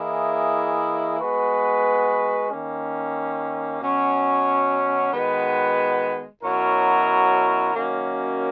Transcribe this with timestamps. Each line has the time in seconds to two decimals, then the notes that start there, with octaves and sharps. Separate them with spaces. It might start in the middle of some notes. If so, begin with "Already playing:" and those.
Already playing: E3 A#3 E4 G#4 D#5
1.19 G#3 B3 F#4 B4
2.49 D#3 A#3 C#4
3.81 B2 F#3 C#4
5.12 D#3 G#3 B3 F#4 B4
6.42 B2 F#3 C#4 E4 A#4
7.74 F#2 D#3 A#3 C#4 F#4